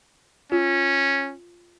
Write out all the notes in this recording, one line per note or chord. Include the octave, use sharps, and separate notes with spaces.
C#4 F4